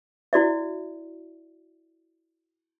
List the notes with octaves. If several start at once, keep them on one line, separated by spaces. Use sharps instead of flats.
E4 F#4 D5 E5